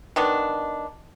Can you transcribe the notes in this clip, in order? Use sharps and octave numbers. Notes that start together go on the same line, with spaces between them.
D#3 B3 D4